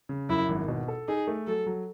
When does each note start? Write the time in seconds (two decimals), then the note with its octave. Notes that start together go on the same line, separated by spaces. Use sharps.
0.09 C#3
0.29 F#2 E4
0.48 G#1
0.68 B2
0.88 A4
1.08 D#4 G#4
1.28 A3
1.47 F#3 A4
1.67 F#3